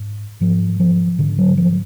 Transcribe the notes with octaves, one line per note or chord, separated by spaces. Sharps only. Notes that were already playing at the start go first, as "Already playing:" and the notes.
Already playing: G#2
G#2 F3
F3
G#2 D3
F#3
F3